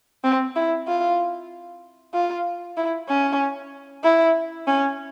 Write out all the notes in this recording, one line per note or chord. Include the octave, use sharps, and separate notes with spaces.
C4
E4
F4
F4
E4
C#4
E4
C#4